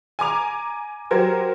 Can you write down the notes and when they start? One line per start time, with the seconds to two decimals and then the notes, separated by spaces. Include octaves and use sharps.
0.19 G#5 A#5 D6 F7
1.11 F#3 G4 A#4 C5 G#6